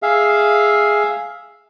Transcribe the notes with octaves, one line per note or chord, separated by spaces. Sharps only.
G#4 E5 F5